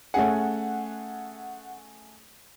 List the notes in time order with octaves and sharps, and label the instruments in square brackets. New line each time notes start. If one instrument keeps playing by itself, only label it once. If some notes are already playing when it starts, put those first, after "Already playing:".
[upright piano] A3 C#4 G#4 [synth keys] F#5